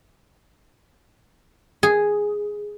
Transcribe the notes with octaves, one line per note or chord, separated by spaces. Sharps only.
G#4